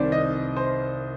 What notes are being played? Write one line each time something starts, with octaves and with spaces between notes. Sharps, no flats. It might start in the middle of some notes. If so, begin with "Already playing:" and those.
Already playing: C2 C3 D#3 C5 D5
D#5
C5